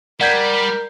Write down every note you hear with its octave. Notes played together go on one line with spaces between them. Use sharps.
G3 A#4 D5 F#5 G6 G#6 B6 C7